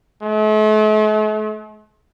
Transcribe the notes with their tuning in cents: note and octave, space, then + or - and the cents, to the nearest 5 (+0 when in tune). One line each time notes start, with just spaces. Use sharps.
A3 -45